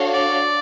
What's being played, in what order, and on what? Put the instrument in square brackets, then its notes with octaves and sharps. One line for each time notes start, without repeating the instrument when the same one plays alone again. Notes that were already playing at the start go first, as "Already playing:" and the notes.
Already playing: [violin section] D4 F#4 A4 C#5 F5
[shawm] D5